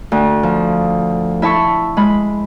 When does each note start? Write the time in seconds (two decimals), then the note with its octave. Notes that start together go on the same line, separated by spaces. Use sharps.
0.12 D2
0.43 F3
1.42 E4 E5 A5 C#6
1.97 G#3 B5